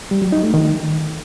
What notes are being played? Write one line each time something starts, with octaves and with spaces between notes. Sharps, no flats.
G3
F#3
D#4
A3
D#3